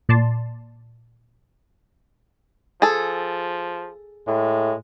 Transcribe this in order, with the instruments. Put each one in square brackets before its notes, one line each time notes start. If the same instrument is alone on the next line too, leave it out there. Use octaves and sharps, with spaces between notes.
[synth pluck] A#2 D5 A5 C6
[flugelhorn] F3 [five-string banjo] G#4 A4
[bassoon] A2 [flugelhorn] G#3